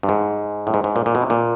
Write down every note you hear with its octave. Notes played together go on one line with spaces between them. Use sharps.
G2
G#2
A2
G#2
G#2
A#2
A#2
B2
C3
A#2